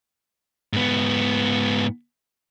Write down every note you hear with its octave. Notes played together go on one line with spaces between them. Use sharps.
G#2 B3